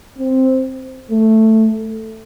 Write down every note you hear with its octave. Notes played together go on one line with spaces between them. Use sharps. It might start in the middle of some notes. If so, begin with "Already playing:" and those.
C4
A3